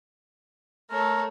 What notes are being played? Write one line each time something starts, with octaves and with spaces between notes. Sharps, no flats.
A3 A#4 C#5